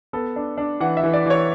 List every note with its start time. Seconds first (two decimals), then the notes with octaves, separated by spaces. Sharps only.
0.13 B3 A4
0.36 D4
0.58 D4
0.80 E3 F#5
0.97 E5
1.03 E3
1.13 D5
1.26 E3 C#5